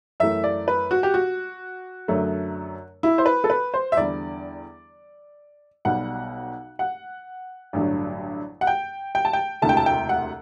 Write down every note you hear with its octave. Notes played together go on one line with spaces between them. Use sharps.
F#2 E3 A3 E5
D5
B4
F#4
G4
F#4
F#2 D3 F#3 A3
E4
C5
B4
A4
B4
C5
E5
E2 D3 G3 D5
B1 B2 G3 F#5
F#5
A1 G2 D3 F#3
F#5
G5
G5
A5
G5
E1 D2 C3 E3 A3 A5
G5
A5
G5
F#5